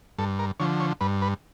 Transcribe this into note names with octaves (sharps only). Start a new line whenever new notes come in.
G2 A4
A#4
D3 F3 C#5
C#5
G2 B4
B4